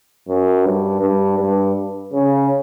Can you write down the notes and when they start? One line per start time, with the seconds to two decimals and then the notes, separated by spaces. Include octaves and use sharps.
0.28 F#2
0.65 G2
1.02 G2
1.39 G2
2.13 C#3